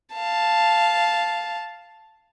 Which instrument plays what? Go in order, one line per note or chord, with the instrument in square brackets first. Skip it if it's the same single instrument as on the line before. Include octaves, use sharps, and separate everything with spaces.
[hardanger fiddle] F5 A5